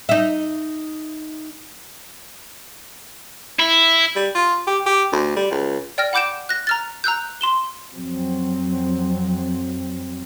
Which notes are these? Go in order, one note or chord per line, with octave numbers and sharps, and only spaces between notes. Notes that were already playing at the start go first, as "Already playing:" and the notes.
D#4 E5
E4
G3
F4
G4
G4
D2
G3
C#2
D5 G5 F6 A#6
F#5 B5 D6 G6 D7 E7
F#6 A#6
A#5 F6 A6
A#5 E6 F#6 G6
C6 E7 G7
F2 F#3 C4